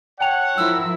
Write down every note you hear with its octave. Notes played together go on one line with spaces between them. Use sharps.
C#5 F#5 G5 A5 F7
F3 E4 A#4 E6